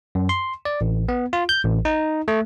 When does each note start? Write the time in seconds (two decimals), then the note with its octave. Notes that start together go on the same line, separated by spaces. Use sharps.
0.15 F#2
0.29 C6
0.65 D5
0.81 A1
1.09 B3
1.33 F4
1.49 G6
1.65 A1
1.85 D#4
2.28 A3